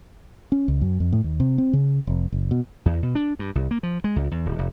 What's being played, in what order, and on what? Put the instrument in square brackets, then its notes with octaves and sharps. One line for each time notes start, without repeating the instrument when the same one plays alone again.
[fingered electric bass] C#4
C#2
F#2
F2
A2
D#2
C3
C4
C#3
F1
F#1
B2
[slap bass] E2
B2
D4
G2
C2
A#3
F3
G#3
C#2
E2
D1
F1